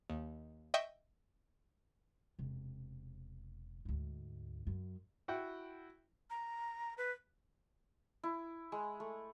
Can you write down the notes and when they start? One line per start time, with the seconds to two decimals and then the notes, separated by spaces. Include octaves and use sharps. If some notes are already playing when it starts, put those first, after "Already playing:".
0.10 D#2
0.74 D#5 E5 G5 C#6
2.39 E1 C3
3.85 D2 G#2
4.67 F#2
5.28 E4 F#4 F#5 G5
6.30 A#5
6.98 B4
8.23 E4
8.72 G#3
9.00 A3